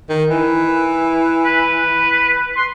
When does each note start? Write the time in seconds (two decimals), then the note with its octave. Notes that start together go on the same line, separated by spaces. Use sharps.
0.09 D#3
0.30 E3
1.45 B4
2.57 C6